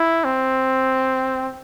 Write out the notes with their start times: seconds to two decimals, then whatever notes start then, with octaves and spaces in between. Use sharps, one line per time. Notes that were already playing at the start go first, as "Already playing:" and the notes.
Already playing: E4
0.24 C4